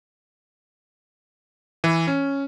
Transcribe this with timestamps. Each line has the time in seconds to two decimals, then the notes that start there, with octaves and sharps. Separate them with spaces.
1.84 E3
2.07 C#4